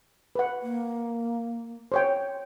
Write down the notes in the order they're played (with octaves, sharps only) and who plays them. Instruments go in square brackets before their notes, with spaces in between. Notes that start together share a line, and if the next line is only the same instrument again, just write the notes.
[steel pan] B4 F#5
[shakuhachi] A#3
[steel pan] C5 C#5 G5